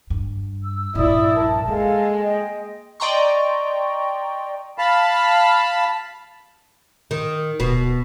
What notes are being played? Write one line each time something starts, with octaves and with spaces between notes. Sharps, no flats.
G2
E6
A#1 G2 E4 D5 D#6 E6
A#4 A5
G#3 A#3 A4 F5
D#5 G5
D5 D#5 G5 A#5 C6 C#6
F5 A5 B5
D#3
D1 B2